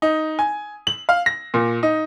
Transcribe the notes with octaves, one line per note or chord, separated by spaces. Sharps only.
D#4
G#5
F#7
F5
A#6
A#2
D#4